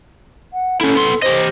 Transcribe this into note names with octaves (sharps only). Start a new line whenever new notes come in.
F#5
C#4 E4 A4
B3 C6
G4 C5 D#5